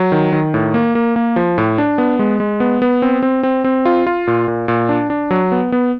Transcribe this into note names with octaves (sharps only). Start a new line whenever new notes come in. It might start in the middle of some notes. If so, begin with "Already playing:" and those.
Already playing: F#3
D#3
D#3
A2
A#3
A#3
A#3
F3
A2
D4
B3
G#3
G#3
B3
B3
C4
C4
C4
C4
F4
F4
A#2
A#2
A#2
D4
D4
F#3
B3
B3